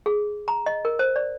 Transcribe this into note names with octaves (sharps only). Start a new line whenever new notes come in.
G#4
A#5
D#5
A#4
C5
D5